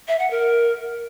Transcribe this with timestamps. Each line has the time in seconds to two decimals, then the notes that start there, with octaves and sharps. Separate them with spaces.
0.08 E5
0.19 F#5
0.31 A#4